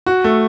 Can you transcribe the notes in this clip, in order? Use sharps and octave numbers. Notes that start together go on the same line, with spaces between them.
F#4
A3